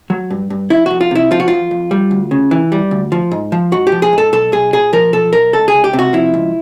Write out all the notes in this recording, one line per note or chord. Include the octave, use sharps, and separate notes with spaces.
F#3
G2
G2
F2 E4
F2 F#4
F4
C3 E4
F3 F4
F#4
F2 F4
F2
G3
D2
C#3
E3
G3
D2
F3
G#2
F3
G#2 F#4
G4
F3
G#4
G#2 A4
B1 A4
B1 G#4
A#2 G#4
F3 A#4
B1 A4
B1 A#4
C#2 A4
G#4
C#2
G4
C3
F#4
F3 E4
C#2